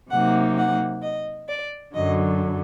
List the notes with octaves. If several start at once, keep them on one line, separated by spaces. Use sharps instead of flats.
C3 F#3 A#3 D#4 F#5
F#5
D#5
D5
F#2 D3 F#3 D#5